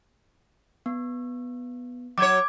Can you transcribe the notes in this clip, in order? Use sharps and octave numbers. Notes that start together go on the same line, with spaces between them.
B3
F#3 C#5 D6 G#6